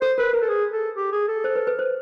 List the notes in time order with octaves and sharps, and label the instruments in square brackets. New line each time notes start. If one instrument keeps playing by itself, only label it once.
[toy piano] A4 [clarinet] C5
[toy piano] A#4 [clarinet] B4
[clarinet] A#4 [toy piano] B4
[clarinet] A4
G#4
A4
G4
G#4
A4
[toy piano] C5
B4
B4
C5